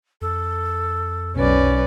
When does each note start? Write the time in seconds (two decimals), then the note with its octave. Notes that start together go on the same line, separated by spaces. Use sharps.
0.21 F2 A4
1.36 B1 C#4 B4 D5